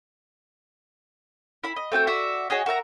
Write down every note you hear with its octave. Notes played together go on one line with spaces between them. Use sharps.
E4 B5
D#5
A3 C4 F#4 G5
F#4 D5 E5
F#4 G#4 C#5 D#5
F#4 A#4 E5 A#5